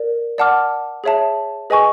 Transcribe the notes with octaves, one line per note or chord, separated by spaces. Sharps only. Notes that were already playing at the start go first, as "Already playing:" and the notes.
Already playing: A#4 D5
D5 F#5 A5 D6 F6
G#4 C#5 E5 A5
G#4 B4 D#5 G#5 C#6